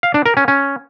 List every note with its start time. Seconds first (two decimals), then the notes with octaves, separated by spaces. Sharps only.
0.03 F5
0.14 D4
0.26 A#4
0.37 C#4
0.48 C#4